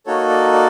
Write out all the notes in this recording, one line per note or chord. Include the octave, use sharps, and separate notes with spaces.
A#3 D#4 F#4 A4 C#5
D5
D5